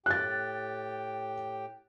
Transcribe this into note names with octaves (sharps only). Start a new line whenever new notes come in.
A2 G4 G5 F#6 A6